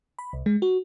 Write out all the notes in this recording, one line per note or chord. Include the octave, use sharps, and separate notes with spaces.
B5
C2
G#3
F#4